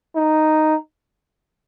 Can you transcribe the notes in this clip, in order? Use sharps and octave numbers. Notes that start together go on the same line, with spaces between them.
D#4